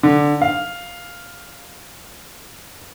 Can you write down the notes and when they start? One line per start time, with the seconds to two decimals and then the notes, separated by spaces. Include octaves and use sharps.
0.03 D3
0.41 F5